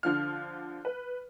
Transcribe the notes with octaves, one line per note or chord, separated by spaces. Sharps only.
D3 F3 F6
B4